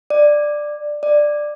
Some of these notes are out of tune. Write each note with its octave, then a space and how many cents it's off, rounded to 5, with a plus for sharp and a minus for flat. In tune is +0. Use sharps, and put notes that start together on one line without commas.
D5 +10
D5 +10